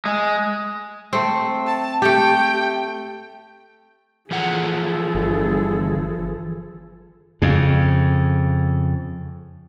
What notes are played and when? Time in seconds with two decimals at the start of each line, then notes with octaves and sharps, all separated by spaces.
0.05 G#3
1.13 A3 C4
1.66 A5
2.02 A3 G4 G5
4.31 E3 F3 G#4 A4 F#5
5.15 G1
7.42 F2 C#3